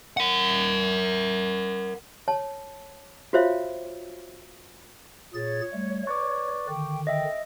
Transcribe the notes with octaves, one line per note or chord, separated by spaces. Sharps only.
A#4 F#5
C#5 A5
F4 F#4 C5 C#5 E5 F5
A#2 G#4 C#5 A6
G3 A3
B4 D5 C#6 D6
D3 D#3 G5
D#5 E5 G5